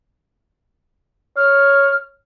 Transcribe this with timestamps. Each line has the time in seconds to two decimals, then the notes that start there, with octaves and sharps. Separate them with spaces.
1.37 C#5 F6